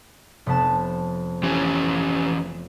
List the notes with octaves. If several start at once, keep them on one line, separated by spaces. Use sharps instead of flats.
F1 B3 A5
E3 C#4 G4